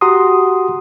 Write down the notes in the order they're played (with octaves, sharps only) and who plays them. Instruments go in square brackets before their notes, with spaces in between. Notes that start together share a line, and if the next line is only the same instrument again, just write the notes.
[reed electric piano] F#4 G4 F#5 A#5 C6 D#6